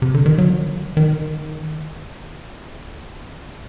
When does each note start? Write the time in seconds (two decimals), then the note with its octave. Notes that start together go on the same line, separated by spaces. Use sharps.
0.02 C3
0.14 D3
0.26 D#3
0.38 F#3
0.97 D#3